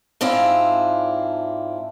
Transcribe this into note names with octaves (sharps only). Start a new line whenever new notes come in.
G#2 C4 D4 E4 F4